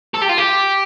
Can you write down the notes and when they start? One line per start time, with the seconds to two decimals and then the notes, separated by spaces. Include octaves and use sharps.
0.14 A4
0.21 G4
0.29 F4
0.38 G4